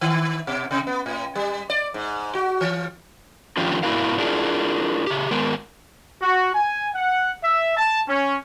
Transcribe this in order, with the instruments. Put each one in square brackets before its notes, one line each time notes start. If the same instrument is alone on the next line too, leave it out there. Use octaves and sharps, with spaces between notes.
[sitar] D#3
B2
C3
B3
A2
G3
D5
G#2
F#4
E3
[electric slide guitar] D3 D#3 F3 C#4 F4 G4
G#2 B2 E4 F#4 A#4 F5
D4 E4 F4 G#4 A#4
C#3 G4
D#3 G#3 B3 A#4
[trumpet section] F#4
G#5
F#5
E5
A5
C#4